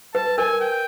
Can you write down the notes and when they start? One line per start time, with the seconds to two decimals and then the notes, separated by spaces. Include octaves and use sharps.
0.14 B4 A5
0.38 A#4 G#5
0.60 G5